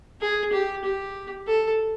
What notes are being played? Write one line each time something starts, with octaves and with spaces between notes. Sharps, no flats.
G#4
G4
G4
A4